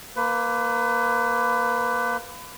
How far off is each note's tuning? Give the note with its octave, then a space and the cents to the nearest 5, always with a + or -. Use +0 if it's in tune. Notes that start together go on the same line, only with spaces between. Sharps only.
A#3 +0 B4 +25